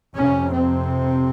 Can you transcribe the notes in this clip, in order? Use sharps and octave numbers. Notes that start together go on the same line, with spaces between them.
F2 C3 C#4
C4